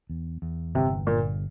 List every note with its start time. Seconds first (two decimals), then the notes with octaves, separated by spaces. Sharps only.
0.10 E2
0.42 E2
0.74 G1 C3
1.07 G1 A#2